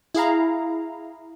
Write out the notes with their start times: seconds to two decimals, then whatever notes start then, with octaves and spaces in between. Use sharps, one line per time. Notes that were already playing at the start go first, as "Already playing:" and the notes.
0.15 E4 G#4 F5 A#5